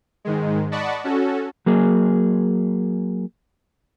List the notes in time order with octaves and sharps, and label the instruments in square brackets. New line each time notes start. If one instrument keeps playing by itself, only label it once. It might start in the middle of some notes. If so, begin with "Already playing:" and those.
[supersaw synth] G#2 D#3 G#3
D5 D#5 F#5 A5 B5 C#6
C#4 F#4 A4
[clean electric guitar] F#3 A#3 G#4